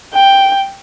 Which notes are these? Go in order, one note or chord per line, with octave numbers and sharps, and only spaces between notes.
G5